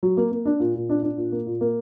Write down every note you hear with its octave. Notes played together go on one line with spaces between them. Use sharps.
F#3
A#3
A#3
D4
A#2
A#2
D4
D4
A#2
A#3
A#2
A#3